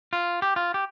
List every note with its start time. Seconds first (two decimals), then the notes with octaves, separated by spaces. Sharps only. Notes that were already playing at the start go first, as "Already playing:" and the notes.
0.13 F4
0.42 G4
0.56 F4
0.74 G4